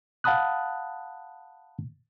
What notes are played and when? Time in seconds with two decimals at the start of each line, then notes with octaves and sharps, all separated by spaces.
0.24 F5 F#5 A5 B5 D#6 F#6